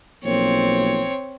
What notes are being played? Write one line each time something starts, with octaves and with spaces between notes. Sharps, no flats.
B1 F3 A#3 C4 C#5